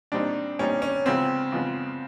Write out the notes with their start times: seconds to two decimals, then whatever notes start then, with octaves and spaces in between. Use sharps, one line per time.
0.12 A#2 G3 C4 D4 D#4
0.59 A#2 G3 C4 C#4 D#4
0.82 C#4
1.06 C#3 F3 G#3 B3 C4
1.52 C#3 F3 G#3 B3